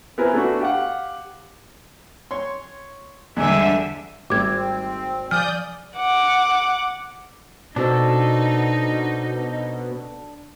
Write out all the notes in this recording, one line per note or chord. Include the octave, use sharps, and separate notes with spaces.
B3 C4 E4 A#4 B4 G#5
A3 B3 D4 F#4
G4 F5 F#5
C#5 C6
E2 D3 G3 G#3 E5
G#1 G3 A3 C4 G4 D6 G#6
F3 D5 G#5 D#6 F6 G6
F#5 D6
B2 C4 D4 D#4 F#4 A4 C5